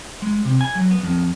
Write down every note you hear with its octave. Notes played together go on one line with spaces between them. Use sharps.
G#3
C3
G#5
F#3
B3
F2